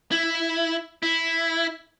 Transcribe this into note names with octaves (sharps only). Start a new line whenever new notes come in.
E4
E4